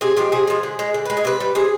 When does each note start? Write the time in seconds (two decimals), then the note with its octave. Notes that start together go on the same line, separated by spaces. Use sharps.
0.01 C3 G#4
0.17 F3 G#3 G4
0.32 C3 G#4
0.47 F3 G#3
0.63 D3
0.79 G#3
0.94 D3
1.05 G#3 B4
1.17 G#4
1.25 C3 B4
1.40 G3
1.55 C3 G#4